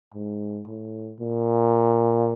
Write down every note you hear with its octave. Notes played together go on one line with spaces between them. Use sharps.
G#2
A2
A#2